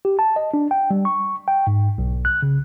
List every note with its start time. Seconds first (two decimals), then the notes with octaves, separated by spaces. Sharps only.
0.05 G4
0.19 A5
0.36 D#5
0.54 D4
0.71 G5
0.91 G3
1.05 C#6
1.48 G5
1.67 G#2
1.98 B1
2.25 F#6
2.42 C#3